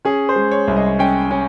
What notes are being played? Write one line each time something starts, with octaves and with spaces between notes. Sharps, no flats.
C#4 G#4
C5
G#3
C#5
C2
D#5
C#4 G5
C#4